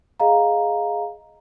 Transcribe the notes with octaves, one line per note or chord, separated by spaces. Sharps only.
G#4 D#5 F5 A#5